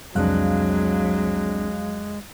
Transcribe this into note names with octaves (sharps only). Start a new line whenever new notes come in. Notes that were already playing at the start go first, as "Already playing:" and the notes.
C2 F2 F#3 G#3 C4 D4 F5 F#6